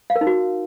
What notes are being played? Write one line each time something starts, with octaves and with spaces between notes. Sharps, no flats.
F5
A#4
D#4
F#4